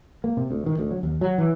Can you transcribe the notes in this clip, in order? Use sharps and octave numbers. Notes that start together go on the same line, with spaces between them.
A#3
C3
D2
D#3
D2
F#3
D#2
F#3
E3